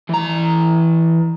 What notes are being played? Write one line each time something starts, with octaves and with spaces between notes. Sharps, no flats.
E3 A#5